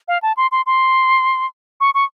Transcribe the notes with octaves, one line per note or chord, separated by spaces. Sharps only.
F5
A5
C6
C6
C6
C#6
C#6